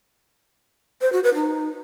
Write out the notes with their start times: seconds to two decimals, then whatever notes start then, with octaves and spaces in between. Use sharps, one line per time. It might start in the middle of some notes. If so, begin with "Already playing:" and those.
1.01 C5
1.12 F#4
1.23 B4
1.35 D#4